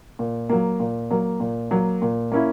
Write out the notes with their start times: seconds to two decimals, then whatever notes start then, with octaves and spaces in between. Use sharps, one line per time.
0.19 A#2
0.49 F#3 A#3
0.80 A#2
1.10 F#3 A#3
1.40 A#2
1.71 F#3 A#3
2.02 A#2
2.32 A#3 C#4 E4